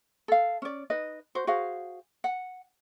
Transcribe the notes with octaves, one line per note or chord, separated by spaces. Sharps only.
A4 F5
C#4 D5
D#4 B4 D#5
F#4 C5
F#4 G#4 C5 F5
F#5